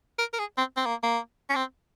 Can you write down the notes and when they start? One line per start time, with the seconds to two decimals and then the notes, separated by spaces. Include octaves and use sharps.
0.19 A#4
0.33 A#4
0.39 G#4
0.58 C4
0.77 C4
0.86 A#3
1.03 A#3
1.50 C#4
1.56 C4